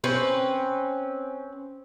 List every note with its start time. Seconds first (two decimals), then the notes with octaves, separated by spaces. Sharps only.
0.04 C4 C#4 B4